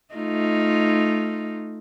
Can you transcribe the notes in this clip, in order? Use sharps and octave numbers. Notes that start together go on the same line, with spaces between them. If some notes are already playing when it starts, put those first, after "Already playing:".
A3 D#4 F4